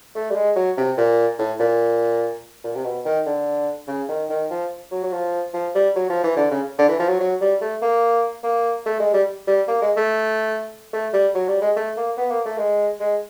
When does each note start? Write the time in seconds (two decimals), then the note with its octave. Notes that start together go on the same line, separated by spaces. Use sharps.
0.15 A3
0.30 G3
0.35 G#3
0.56 F#3
0.77 C3
0.98 A#2
1.39 A2
1.60 A#2
2.64 A#2
2.75 C3
2.84 B2
3.05 D#3
3.26 D3
3.88 C#3
4.09 D#3
4.29 D#3
4.50 F3
4.91 F#3
5.03 F#3
5.13 F3
5.54 F3
5.75 G3
5.96 F#3
6.10 F3
6.23 E3
6.36 D3
6.51 C#3
6.78 D3
6.88 E3
6.99 F3
7.09 F#3
7.20 F#3
7.41 G3
7.61 A3
7.82 A#3
8.43 A#3
8.86 A3
9.00 G#3
9.13 G3
9.47 G3
9.68 A#3
9.82 G#3
9.97 A3
10.93 A3
11.13 G3
11.35 F#3
11.48 G3
11.62 G#3
11.76 A3
11.97 A#3
12.17 B3
12.30 A#3
12.45 A3
12.58 G#3
13.00 G#3